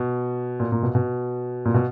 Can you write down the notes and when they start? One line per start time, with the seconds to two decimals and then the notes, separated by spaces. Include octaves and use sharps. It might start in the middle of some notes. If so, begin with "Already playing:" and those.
Already playing: B2
0.60 A#2
0.72 A#2
0.83 B2
0.95 B2
1.65 A#2
1.74 B2